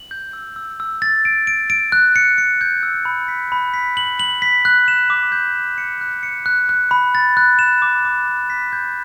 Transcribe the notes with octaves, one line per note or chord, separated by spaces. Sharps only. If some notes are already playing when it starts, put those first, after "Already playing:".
Already playing: F#7
G6
E6
E6
E6
A6
D7
D7
D7
F#6
C#7
C#7
G6
E6
B5
B6
B5
B6
F#7
F#7
B6
F#6
E7
D6
G6
E7
C#7
F#6
C#7
F#6
F#6
B5
A6
F#6
E7
D6
D6
D6
B6
G6